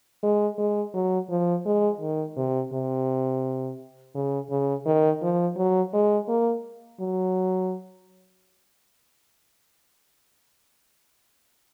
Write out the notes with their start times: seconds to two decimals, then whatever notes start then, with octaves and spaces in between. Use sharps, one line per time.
0.23 G#3
0.58 G#3
0.94 F#3
1.30 F3
1.66 G#3
2.01 D#3
2.37 C3
2.73 C3
4.15 C#3
4.50 C#3
4.86 D#3
5.22 F3
5.57 F#3
5.93 G#3
6.28 A#3
7.00 F#3